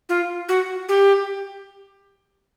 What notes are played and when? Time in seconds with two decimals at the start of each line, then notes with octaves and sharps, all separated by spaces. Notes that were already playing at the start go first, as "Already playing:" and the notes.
0.09 F4
0.49 F#4
0.89 G4